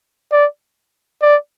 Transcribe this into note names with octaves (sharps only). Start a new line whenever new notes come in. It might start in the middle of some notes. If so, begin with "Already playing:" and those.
D5
D5